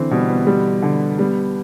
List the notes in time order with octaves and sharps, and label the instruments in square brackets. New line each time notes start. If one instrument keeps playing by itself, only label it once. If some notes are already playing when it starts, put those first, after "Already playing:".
Already playing: [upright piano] D3 E3 [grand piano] C4
[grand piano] B2 [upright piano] G3
[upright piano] B3
[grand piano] G3
D3
[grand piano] G3 [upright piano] B3